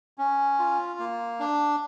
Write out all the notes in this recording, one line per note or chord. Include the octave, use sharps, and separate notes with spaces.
C#4
F4
A#3
D4